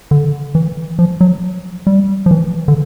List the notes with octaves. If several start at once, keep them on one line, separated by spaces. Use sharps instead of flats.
D3
E3
F3
F#3
G3
F3
E3
D3